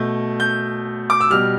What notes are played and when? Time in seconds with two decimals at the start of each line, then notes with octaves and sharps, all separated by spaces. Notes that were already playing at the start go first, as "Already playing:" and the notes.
Already playing: B2 A3 G6
0.40 G6
1.10 D6
1.21 E6
1.30 B2 G3 F6